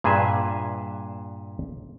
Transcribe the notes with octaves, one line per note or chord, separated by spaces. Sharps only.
G2 A#2 G#4 B4 E5